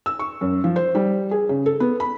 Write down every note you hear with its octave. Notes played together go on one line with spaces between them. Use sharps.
E6
C#6
F#2
F3
C5
G3
G#4
C#3
A4
B3
B5